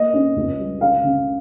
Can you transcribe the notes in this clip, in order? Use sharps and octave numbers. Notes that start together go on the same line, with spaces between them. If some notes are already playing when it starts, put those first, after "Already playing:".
Already playing: A#3 D#5
C#4
C#2
G3
C#3 F5
C#3